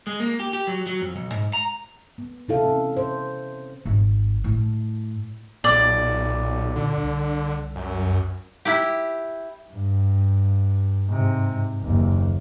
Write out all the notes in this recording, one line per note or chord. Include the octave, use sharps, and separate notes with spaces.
G#3
A#3
G4
G4
F#3
F#3
F2
B1
G#2
A#5
B3
C3 E4 A4 F5
C#4
C5
G#1
A2
B1 A#2 D5
D3
C2
F#2
E4 G4
G2
G#2 C3
F#1 D#2